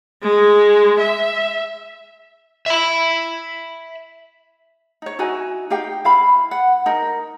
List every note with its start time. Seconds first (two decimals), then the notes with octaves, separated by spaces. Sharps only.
0.23 G#3
0.99 E5
2.66 E5 B5
5.02 D#4 C#5
5.19 D#4 E4 F#4 G#5
5.70 D#4 G4 F5 G5
6.05 E4 F5 B5
6.51 F#5
6.86 D#4 A#4